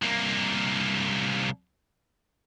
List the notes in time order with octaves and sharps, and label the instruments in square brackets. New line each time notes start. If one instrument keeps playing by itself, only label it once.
[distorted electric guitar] C2 A#3